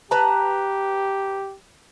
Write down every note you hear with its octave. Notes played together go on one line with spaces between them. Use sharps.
G4 B4 A5 A#5